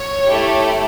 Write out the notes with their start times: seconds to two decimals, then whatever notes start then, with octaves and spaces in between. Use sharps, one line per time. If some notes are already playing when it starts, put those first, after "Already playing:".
Already playing: C#5
0.25 A3 E4 G4